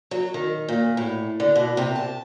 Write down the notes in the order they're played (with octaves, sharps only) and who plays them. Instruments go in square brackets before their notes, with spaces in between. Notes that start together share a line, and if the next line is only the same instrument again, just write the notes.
[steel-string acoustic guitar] F#3
D#3
A#2
A2
D3
B2
C3
A5